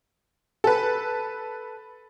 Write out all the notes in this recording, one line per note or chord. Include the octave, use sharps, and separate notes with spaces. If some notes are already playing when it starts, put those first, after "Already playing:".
A4 B4